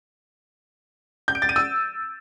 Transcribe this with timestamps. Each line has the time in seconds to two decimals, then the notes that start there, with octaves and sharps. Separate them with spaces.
1.28 G6
1.35 D7
1.42 A6
1.49 D#7
1.56 E6